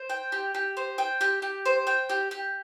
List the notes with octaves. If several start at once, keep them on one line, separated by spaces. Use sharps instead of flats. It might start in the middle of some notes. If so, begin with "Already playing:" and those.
Already playing: C5
G5
G4
G4
C5
G5
G4
G4
C5
G5
G4
G4